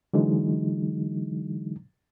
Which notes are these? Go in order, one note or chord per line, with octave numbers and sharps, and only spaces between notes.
D3 E3 F#3 G#3 D#4